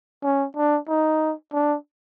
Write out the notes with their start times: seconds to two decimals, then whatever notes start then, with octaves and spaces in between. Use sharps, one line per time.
0.23 C#4
0.56 D4
0.88 D#4
1.53 D4